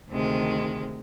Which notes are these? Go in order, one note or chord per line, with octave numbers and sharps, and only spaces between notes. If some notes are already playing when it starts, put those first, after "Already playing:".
D2 C3 D#3 G#3